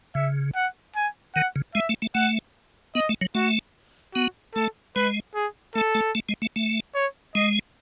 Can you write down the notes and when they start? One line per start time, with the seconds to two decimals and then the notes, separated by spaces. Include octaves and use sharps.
0.15 C#3 E5
0.55 F#5
0.96 G#5
1.35 D#3 F#5
1.56 C#3
1.75 G#3 E5
1.89 A3
2.02 A3
2.15 A3 F#5
2.95 B3 D#5
3.09 A3
3.21 F#3
3.35 A3 F#4
4.15 B3 F#4
4.55 A3 A4
4.96 G#3 B4
5.35 G#4
5.75 A3 A4
5.95 A3
6.15 A3
6.29 G#3
6.42 A3
6.56 A3
6.95 C#5
7.35 G#3 D#5